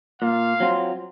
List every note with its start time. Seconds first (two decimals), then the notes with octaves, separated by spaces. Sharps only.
0.22 A#2 F5
0.60 F#3 C4 F4